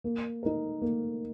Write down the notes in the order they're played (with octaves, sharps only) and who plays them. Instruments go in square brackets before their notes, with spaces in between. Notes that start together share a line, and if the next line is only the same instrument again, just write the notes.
[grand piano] A#3
D#4 A#4
A#3